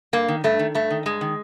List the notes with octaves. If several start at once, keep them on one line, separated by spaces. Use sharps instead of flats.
G2 A#3
D#3
G2 A3
D#3
G2 A3
D#3
G2 G#3
D#3